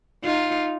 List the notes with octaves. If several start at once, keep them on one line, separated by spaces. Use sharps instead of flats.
D#4 F4